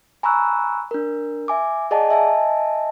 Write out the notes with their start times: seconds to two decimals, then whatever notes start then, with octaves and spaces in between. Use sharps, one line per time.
0.23 G#5 A#5 B5 C#6 E6 F#6
0.91 D4 A#4
1.48 E5 G#5 D6
1.91 G#4 D5 D#5 F#5 G#5 A5
2.09 D#5 E5 G#5 A5